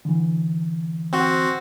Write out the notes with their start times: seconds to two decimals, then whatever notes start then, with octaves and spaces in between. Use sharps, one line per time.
0.05 D3 E3
1.13 C4 F#4